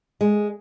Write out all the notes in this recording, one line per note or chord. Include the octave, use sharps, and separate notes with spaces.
G#3